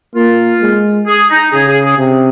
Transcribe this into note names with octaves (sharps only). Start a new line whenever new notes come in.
A#3 F4
G#3
G#4
D#4
C#3 G#4
G#4
G#4
C3